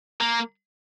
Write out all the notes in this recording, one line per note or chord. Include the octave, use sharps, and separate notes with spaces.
A#3